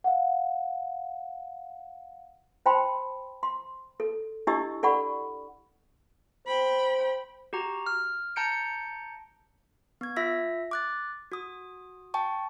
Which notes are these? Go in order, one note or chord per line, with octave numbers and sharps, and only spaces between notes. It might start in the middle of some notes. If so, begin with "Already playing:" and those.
F5 F#5
C5 G5 A5 B5 C6
C6
A4
D4 E4 G4 D#5 C#6 E6
A4 D5 F#5 B5 C#6
C5 G5 B5
F#4 G4 A#5
F6
A5 A#5 G6 C#7 D7
B3 G#6
F4 E5 E6 A#6 B6
D6 F#6 A6
F#4 D#6
G5 A5 C#6